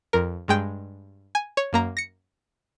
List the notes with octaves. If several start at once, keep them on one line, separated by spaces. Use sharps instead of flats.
F2 A#4
G2 G#3 G5 G6
G#5
C#5
F#2 A#3 A#5
A#6 C#7